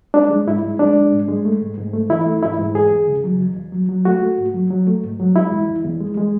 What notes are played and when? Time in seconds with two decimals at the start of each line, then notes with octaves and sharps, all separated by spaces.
0.14 G#3 D4
0.30 G#3
0.46 G#2 E4
0.63 G#3
0.79 G#3 D4
0.95 G#3
1.12 G#2
1.29 G#3
1.45 A3
1.61 G#2
1.77 G#2
1.93 A3
2.09 E3 E4
2.26 A3
2.43 G#2 E4
2.59 G#2
2.75 E2 G#4
2.91 E2
3.07 C#3
3.24 F#3
3.40 E2
3.56 E2
3.72 F#3
3.89 F#3
4.05 A3 F#4
4.21 A3
4.38 G#2
4.54 F#3
4.70 F#3
4.87 A3
5.03 G#2
5.20 F#3
5.36 G#3 E4
5.52 E2
5.68 E2
5.84 E2
6.01 G#3
6.17 G#3